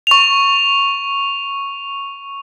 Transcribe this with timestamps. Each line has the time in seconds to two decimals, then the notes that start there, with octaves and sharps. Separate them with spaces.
0.07 C#6 F7